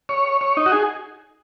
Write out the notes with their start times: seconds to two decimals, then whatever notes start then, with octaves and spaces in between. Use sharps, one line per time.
0.09 C#5
0.41 C#5
0.57 D#4
0.66 F#4
0.72 G#4